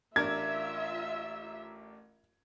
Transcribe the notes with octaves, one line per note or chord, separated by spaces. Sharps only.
A1 D4 F4 A#4 E5 G#6